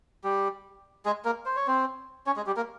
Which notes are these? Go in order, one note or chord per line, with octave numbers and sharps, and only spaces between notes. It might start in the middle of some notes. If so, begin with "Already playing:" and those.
G3 G4
G#3 G#4
A#3 A#4
C5
C#5
C4 C5
C#4 C#5
G#3 G#4
G3 G4
A#3 A#4